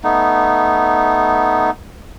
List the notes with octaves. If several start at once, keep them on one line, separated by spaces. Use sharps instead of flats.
A3 B3 D#4